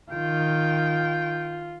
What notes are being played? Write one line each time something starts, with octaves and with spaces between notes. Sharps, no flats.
D#3 F4 G5